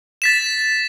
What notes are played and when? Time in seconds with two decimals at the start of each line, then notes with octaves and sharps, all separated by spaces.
0.22 A6 B6 E7